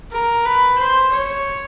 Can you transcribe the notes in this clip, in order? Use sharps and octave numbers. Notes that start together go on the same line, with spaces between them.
A#4
B4
C5
C#5